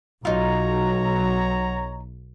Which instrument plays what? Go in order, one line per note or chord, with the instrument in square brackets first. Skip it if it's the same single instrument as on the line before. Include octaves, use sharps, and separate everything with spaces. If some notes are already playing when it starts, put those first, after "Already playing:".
[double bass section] B1 [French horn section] F#3 [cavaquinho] D#4 F4 [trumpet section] C#5 A#5